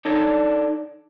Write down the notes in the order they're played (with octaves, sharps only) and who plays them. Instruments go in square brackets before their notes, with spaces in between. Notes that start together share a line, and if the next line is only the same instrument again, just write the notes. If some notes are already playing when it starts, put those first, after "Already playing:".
[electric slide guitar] D4 D#4 A4 C#5 D5